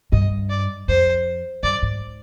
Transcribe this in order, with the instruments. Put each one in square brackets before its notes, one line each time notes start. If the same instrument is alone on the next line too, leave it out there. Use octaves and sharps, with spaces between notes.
[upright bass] G2 [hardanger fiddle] D#5
[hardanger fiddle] D5
[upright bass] F2 [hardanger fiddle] C5
[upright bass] G2 [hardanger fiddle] D5
[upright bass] G#2